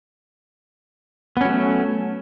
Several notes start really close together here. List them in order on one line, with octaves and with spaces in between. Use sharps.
B3 C#4 F#3 A3